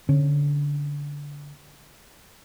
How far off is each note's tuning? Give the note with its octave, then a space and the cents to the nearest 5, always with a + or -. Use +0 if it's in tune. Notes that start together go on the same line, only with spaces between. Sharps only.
D3 -20 C#4 -20